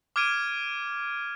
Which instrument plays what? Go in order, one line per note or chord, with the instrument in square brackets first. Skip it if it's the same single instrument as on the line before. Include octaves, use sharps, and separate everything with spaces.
[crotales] D6 F6 G#6 D7 D#7